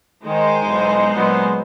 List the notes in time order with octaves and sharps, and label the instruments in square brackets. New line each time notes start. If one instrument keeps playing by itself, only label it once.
[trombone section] D#3 [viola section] G#3 D#4 C5
[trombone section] B1 E2 B2
A#2 F#3 B3